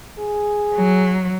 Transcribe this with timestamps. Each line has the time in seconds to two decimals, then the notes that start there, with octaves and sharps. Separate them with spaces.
0.19 G#4
0.74 F#3